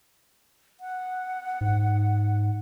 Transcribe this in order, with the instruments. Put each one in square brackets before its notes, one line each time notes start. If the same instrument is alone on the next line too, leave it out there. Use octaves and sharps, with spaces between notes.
[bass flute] F#5
[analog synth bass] G#2